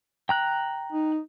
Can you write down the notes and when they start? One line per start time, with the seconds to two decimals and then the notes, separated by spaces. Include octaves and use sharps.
0.29 G5 A#5 F#6
0.92 D#4